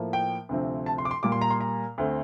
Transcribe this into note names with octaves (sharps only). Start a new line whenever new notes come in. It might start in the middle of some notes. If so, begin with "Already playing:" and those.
Already playing: A2 F3 A#3
G5
D2 C3 F3 C4
A5
C6
D6
C6
A#2 G3 A#3 D6
C6
A#5
C6
A#5
D2 D3 A3 C4